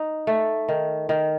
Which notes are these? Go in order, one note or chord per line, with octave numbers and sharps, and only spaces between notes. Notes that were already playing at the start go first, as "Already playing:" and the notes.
Already playing: D#4
A3
D#3
D#3